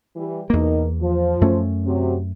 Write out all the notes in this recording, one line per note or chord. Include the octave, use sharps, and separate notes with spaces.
E3 G3 G4
E2 B2 A#3 D#4 A#4
F3
F#2 A3 C#4
C3 F#3